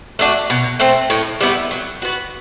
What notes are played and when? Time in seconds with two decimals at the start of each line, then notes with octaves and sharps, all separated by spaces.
0.19 A3 D4 F#4
0.50 B2
0.80 A3 C4
1.10 A2
1.41 G3 B3 E4
1.71 F#3
2.02 B3 F#4